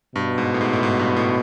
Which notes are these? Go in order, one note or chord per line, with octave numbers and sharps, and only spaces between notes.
G2 B2
G#2
A2
G#2
A2
G#2
G2
A2